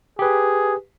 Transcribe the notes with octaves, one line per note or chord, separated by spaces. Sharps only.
G4 G#4 B4